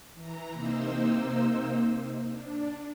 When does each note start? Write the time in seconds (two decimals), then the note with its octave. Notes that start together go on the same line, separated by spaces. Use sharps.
0.14 E3 A#5
0.52 C3 A#3 D#4 C5 E6
2.31 D4